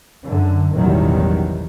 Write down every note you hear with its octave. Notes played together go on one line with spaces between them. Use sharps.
F#2 D3
A1 E2 B2 D#3 F#3 G3